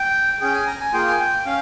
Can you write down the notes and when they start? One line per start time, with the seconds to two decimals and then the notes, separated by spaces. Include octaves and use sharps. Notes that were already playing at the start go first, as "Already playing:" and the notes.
Already playing: G5
0.41 C#4 G#4 G5
0.54 G#5
0.67 A#5
0.80 G#5
0.93 A#3 F4 G#4 G5
1.08 G#5
1.20 G5
1.46 C#4 F5